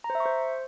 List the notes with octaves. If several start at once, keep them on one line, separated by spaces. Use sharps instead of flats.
A#5
C5
E5
C#6
C5